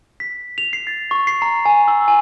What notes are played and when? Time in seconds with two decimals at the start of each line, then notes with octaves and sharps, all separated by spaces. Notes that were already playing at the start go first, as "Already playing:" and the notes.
0.20 B6
0.58 F7
0.73 C7
0.87 A6
1.11 C#6
1.27 C7
1.42 A#5
1.65 G#5
1.88 E6
2.08 G#5